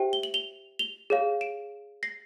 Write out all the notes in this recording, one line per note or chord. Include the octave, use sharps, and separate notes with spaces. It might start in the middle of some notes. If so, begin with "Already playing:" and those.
Already playing: G4 C5 E5 G5
G7
F#7
F7 G7
F7 G7
G#4 C#5 F5
D7 E7
A#6 C7